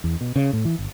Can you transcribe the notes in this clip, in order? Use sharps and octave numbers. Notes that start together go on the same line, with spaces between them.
E2
B2
C#3
A2
E3
G1